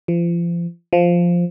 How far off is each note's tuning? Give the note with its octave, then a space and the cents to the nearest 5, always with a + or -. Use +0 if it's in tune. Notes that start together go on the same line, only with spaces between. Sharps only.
F3 -35
F3 +0